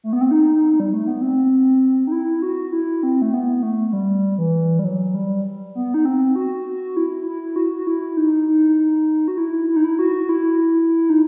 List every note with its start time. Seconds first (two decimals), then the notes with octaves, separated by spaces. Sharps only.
0.04 A3
0.13 B3
0.21 C4
0.31 D#4
0.80 G3
0.94 A3
1.07 B3
1.22 C4
2.07 D#4
2.12 E4
2.42 F#4
2.72 E4
3.03 C4
3.22 A3
3.34 B3
3.63 A3
3.88 A3
3.93 G3
4.38 E3
4.79 G3
4.84 F#3
5.15 G3
5.75 B3
5.94 D#4
6.05 C4
6.35 F#4
6.66 F#4
6.97 E4
7.27 E4
7.56 F#4
7.76 F#4
7.87 E4
8.17 D#4
8.48 D#4
9.28 F#4
9.38 E4
9.68 E4
9.76 D#4
9.84 E4
9.99 F#4
10.29 E4
11.10 D#4